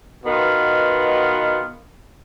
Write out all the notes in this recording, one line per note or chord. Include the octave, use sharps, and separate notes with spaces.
B2 D#3 B3 F4